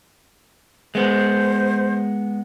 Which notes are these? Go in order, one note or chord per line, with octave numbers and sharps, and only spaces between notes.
G#3 B3 C5